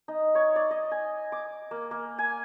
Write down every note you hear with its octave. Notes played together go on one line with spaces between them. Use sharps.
D#4
C#5
D5
D#5
G#5
D6
A#3
A#3
G#5